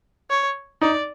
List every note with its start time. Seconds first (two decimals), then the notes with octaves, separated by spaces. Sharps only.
0.30 C#5
0.81 D#4 D5